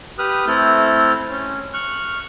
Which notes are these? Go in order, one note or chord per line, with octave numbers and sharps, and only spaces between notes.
G4 B4 D#6 F6 F#6
A3 C4 E4 A4 F6 G6
C#4
C#6 F6 F#6